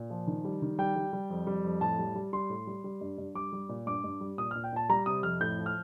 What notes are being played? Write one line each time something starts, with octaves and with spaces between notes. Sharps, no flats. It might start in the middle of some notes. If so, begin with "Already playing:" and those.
Already playing: A#2
F3
D#3
G3
D#3
G3 G5
G3
G3
F2
G3
F2
A2 A5
G3
G3
G3 C6
A2
G3
G3
G2
G2
G3 D6
G3
A#2
G2 D6
G2
G3
A#2 D#6
F6
A#2
G5
A#2 A5
G3 A#5
C3 D#6
F2 F6
A2 G6
F3
F6